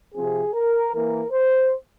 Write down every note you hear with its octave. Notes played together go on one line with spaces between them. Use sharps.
C3 F3 C4 G#4
A#4
E3 A#3 A#4
C5